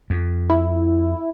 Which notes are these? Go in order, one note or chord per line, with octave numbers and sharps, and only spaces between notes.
F2
E4